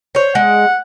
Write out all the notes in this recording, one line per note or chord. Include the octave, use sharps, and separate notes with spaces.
C5 C#5
G#3 F#5